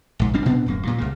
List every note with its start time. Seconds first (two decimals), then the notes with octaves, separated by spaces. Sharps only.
0.19 A#1 G#2
0.34 A#1 G3 C4 D4
0.46 A#2 B3 C4 D4
0.66 D1 F#2 A#3
0.85 G2 A#2
0.98 C2 C#3 A#3